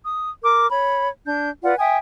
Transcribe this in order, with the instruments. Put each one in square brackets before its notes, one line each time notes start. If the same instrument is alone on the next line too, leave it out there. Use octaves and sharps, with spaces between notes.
[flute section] D#6
A#4 D6
C#5 B5
D4 G6
F4 B4 D5 F#5
E5 G5 G#5 D#6